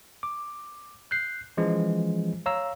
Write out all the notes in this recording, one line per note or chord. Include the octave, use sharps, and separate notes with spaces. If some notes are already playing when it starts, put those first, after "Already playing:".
D6
F#6 G6 C7
E3 F3 G#3 C#4
C#5 F5 A#5 E6